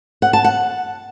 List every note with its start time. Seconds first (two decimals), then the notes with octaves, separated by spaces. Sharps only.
0.22 F#5
0.33 A5
0.44 F#5